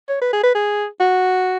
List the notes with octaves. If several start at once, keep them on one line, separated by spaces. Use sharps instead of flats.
C#5
B4
G#4
B4
G#4
F#4